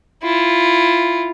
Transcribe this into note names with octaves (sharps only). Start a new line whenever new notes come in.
E4 F4